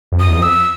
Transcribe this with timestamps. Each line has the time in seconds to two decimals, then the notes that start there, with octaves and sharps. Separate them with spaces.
0.12 F2
0.20 F#2 D#6
0.29 E2
0.37 F2
0.42 E6